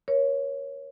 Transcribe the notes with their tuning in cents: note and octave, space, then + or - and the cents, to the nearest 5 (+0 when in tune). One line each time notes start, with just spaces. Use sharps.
A#4 +35 C#5 +0